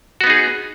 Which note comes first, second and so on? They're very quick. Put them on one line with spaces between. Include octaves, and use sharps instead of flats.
F#4 B3 D#4 G#4